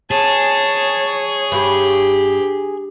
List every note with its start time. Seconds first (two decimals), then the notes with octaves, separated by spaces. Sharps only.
0.11 G#4 C#5 A5
1.52 G2 G4